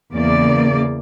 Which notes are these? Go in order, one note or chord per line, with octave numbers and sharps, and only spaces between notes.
E2 C#3 A#3 D5